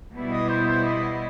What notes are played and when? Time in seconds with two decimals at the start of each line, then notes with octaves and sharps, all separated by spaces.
0.14 B2 G3 B3 E4
0.31 D#5
0.49 C5
0.67 C5
0.83 D#5